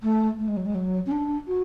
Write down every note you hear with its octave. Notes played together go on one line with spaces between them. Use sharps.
A3
A3
G#3
F#3
G#3
F#3
C#4
D4
F#4